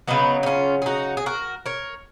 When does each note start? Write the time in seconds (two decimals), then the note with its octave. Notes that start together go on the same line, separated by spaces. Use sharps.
0.08 C#3 F#3 B3 D#4
0.43 D#4
0.46 C#4 F4
0.82 G#4
0.86 D#4 F#4
1.17 G#4
1.26 F#4 A#4
1.66 A#4 C#5